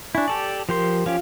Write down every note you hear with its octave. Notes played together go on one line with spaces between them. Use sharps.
D4 E4 G#5 C#6
G4 A4 D5 A5
F3 G4 A#4 C6
F3 C#4 F4 G4 F5